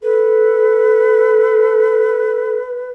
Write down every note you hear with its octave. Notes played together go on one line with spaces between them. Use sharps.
A4 B4